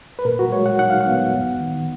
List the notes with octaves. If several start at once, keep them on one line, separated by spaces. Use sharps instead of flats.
B4
A#2 A#4
F#4
G#3 C#5
F#5
D#4 F#5
F5
F#5
B3
F2
D#3